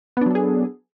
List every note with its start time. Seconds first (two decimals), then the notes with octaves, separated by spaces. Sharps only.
0.17 B3
0.21 D4
0.26 F#3
0.31 A4
0.35 G#4